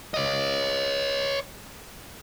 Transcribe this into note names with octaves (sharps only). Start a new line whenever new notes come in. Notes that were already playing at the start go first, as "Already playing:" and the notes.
C#5 D#5